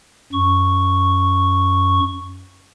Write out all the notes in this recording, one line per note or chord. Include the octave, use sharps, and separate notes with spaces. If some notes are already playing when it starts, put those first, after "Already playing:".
F#2 C#6